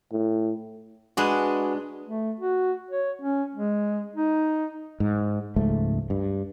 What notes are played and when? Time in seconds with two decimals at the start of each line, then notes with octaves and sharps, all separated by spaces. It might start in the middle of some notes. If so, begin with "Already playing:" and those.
0.12 A2
1.17 G#3 D4 F#4 G#4 B4
2.06 A3
2.40 F#4
2.91 C#5
3.22 C#4
3.55 G#3
4.16 D#4
5.00 G#2
5.56 C#2 G#2 F3 A3
6.10 G2